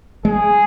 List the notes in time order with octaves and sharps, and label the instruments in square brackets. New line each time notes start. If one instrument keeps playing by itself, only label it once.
[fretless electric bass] G#3 [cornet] G#4